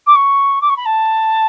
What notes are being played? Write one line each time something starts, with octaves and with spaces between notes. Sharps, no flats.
D6
C#6
D6
C#6
B5
A5